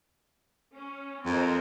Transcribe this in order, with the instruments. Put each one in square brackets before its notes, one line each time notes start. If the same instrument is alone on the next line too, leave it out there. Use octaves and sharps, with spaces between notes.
[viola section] C#4
[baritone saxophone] F2 [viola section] C4 A#4 D#5